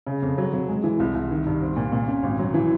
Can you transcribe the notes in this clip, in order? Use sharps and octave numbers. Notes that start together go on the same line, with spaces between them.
C#3
F2
F#3
F#3
G#3
E3
C2
C2
D#3
G2
C4
A#2
A#2
C#4
G#1
F#3
E3